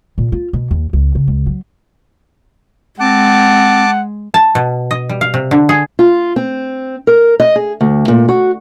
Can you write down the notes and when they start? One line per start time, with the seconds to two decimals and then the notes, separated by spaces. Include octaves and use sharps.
0.18 A#2
0.32 F4
0.53 B2
0.71 D#2
0.93 C#2
1.15 C#3
1.28 C#2
1.46 F#3
3.00 G#3 C4 F#5 A5 D6
4.34 A5
4.55 B2
4.91 D#5
5.09 G3
5.21 F5
5.34 C3
5.51 D3
5.69 G#4
5.99 F4
6.36 C4
7.07 A#4
7.40 D#5
7.56 G#4
7.81 D2
8.08 A#2
8.29 F#4